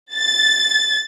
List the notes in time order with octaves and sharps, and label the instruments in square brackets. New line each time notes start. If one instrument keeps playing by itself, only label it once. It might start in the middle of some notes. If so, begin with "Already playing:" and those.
[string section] A6